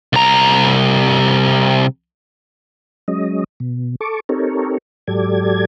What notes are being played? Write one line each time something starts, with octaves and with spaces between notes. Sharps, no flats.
C2 A#5
F#3 G#3 C#4 D#5
B2
A4 A5 C#6 D6
C4 D#4 G4 A4 A#4 C#5
G#2 F#3 G4 A4 D5 G#6